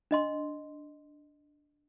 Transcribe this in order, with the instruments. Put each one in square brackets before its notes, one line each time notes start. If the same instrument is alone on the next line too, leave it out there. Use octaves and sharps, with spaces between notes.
[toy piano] D4 D#5 C6